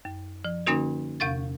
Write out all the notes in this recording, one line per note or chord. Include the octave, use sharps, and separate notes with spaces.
F#2
F3
D3 A#3 C#4 D#4 F#4 A#4
E2 C3 F5 F#5 C#6 A6